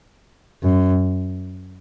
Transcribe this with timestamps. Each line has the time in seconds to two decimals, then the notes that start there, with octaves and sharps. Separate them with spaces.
0.63 F#2